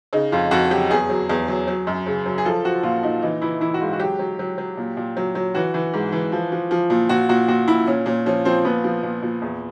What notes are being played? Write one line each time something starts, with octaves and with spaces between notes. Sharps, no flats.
C#3 D#4
F2 F4
F2 F#4
F#3 G4
E2 G#4
F#3
E2
F#3
F#3
F#2
C#3
F#3
G#4
F3 A4
F3 F#4
A#2 F4
A#2 D#4
E3 D#4
E3 E4
E3 E4
F#4
G#2 F4
F#4
F#3 G4
F#3
F#3
F#3
A#2
A#2
F#3
F#3
E3 F#4
E3
G#2
E3
F3
F3
F3
A#2
A#2 F#4
A#2 F#4
A#2 F#4
A#2 E4
A#2 C#4
A#2 C#4
F3 C#4
F3 C4
A#2 B3
F3
A#2
A#2
E2